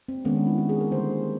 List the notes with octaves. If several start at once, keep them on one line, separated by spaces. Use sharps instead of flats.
C4
D#3 G#3 B3 C#4
D4
E4
F#4
G#4
A#4
D3 G3 A#3 C5